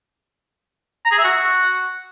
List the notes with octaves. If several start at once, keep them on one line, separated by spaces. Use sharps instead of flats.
A#5
G#4
E5
F#4